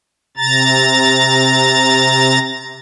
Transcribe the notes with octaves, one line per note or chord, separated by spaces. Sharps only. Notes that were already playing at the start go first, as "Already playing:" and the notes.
C3 A#5 A6